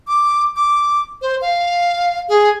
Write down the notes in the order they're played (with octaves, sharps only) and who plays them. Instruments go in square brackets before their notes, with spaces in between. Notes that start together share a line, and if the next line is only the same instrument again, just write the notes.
[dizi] D6
D6
C5
F5
G#4